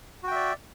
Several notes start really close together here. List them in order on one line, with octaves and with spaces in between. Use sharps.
F#4 G5 E5 D5